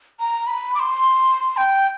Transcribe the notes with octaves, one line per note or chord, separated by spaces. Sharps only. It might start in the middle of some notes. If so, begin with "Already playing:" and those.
A#5
B5
D6
C6
G5